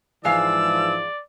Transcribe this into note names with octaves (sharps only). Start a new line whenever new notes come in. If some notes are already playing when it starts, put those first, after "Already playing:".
G#2 E3 F3 G#3 D5 F5 E6